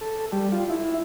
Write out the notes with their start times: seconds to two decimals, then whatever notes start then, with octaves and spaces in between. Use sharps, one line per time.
0.01 A4
0.32 G3
0.52 F4
0.70 E4